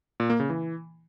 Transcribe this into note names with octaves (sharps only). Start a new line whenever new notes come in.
A#2
A#3
C#3
E3